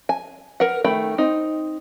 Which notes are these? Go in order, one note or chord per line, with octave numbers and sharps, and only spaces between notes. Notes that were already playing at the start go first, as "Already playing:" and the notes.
G#5
A#4 B4 F#5
D#3 A3 G5 B5
C4 D#4